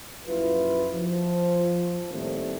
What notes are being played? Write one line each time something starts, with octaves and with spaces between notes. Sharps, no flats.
A#1 F#2 E4 F4 B4
F3
A2 D#3 G3 A3 A#3 C4